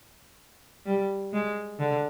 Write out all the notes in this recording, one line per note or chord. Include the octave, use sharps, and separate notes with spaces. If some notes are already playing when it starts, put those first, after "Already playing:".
G3
G#3
D3